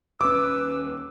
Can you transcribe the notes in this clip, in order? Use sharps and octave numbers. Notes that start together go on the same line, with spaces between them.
D#1 C#4 B4 D6 E6